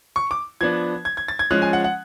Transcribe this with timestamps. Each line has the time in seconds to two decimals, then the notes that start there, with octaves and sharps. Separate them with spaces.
0.16 C#6
0.31 D6
0.61 F3 B3 D4 G#6
1.05 G#6
1.17 G#6
1.28 A6
1.39 G#6
1.51 F3 G#3 C#4 F#6
1.62 G#5
1.73 F#5
1.84 F#5